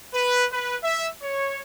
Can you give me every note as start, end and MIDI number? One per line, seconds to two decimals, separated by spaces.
0.13 0.44 71
0.51 0.76 71
0.82 1.07 76
1.22 1.58 73